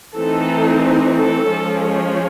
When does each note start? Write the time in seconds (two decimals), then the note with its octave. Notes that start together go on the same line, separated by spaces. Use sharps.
0.16 E3 A3 C4 D#4 A4
1.15 A4
1.49 F3 G#3 C#4